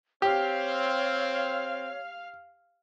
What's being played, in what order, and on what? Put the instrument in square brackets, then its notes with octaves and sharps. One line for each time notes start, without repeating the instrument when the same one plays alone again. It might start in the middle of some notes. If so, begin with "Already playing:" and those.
[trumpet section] C4 [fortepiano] G4 [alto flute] C#5 [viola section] F5